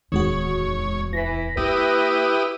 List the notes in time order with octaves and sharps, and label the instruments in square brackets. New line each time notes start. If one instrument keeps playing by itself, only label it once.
[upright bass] D1 E2 [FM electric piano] D#3 G#3 F#4 [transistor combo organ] C#5
[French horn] E3 [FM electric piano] A#6 B6
[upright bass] A#3 [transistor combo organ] E4 G4 D#6 [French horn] B4